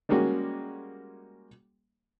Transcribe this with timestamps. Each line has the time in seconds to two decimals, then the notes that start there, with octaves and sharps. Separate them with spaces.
0.09 G3 G#3 A#3 C#4 F#4